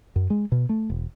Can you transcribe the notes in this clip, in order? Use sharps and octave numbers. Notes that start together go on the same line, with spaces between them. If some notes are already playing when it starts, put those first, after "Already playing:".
F#2
G#3
B2
A3
E1